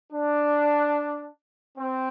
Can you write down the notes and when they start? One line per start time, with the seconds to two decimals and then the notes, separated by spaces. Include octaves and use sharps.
0.12 D4
1.78 C4